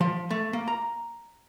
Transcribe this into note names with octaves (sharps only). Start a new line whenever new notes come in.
F3
A3
A#3
A#5